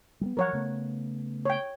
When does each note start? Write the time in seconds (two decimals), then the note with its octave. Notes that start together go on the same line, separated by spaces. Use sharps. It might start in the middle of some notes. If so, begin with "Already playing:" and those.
0.21 G3 G#3 B3
0.37 F3 F#3 A#4 C#5 F#5
0.53 C#3 A3 B3
1.46 C#5 G5